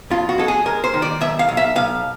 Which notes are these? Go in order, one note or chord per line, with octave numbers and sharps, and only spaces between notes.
F2 F4
F#4
G#3 A4
G#4
G#3 A#4
C5
D#3
D5
B1 E5
F5
B1
E5
B1 F5